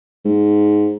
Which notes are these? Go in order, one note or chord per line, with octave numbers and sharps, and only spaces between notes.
G#2